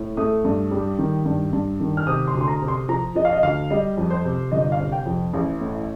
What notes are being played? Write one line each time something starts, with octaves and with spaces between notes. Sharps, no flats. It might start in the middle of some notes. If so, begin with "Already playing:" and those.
Already playing: A2
A3 D#6
G2
G3
D#3
G2
G2
D#3
F6
C3 D#6
C6
D2
C6
A#5
C3
C6
F3 A#5
F3 D#5
F5
D#5
D2 F5
G3 D#5
F2
C5
C3
G1 D#5
F5
C3
G5
F2
A1
A2